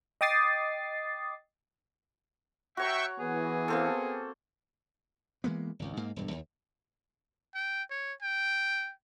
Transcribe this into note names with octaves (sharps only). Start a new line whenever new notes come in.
D#5 G5 D6 D#6 A6 C7
F#4 C#5 E5 G5 A#5 C#6
E3 B3 G#4
A#3 C4 A4
E3 G#3 A#3 B3
G#1 C#2
G#2 A#3
E1 G2
D#2
G5
C#5
G5